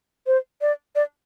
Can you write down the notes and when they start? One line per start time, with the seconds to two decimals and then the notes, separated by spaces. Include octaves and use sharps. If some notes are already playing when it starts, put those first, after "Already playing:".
0.27 C5
0.61 D5
0.95 D5